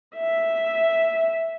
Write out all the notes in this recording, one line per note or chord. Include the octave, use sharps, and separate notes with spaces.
E5